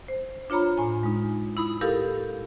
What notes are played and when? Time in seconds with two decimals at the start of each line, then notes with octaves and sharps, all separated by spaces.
0.08 C5
0.50 D4 F4 C#5 A#5 B5
0.78 A2 G#5
1.03 G#3 D#4
1.57 E4 B5 D#6 E6
1.81 E4 G4 A4 A#4 F5